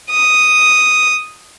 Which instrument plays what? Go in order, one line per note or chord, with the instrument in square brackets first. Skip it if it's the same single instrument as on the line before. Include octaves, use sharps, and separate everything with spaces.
[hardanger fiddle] D#6